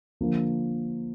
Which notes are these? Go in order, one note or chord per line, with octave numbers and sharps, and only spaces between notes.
D3 F3 A#3